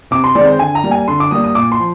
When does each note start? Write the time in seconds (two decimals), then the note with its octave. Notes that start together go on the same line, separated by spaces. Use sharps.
0.11 C3 D6
0.24 C6
0.35 D#3 G#3 C4 D5
0.47 C5
0.59 D3 G#5
0.75 A#5
0.84 G3 A#3
0.91 G#5
1.08 D3 C6
1.20 D6
1.31 G3 A#3 D#6
1.44 D#6
1.55 A#2 D6
1.72 C6
1.79 F3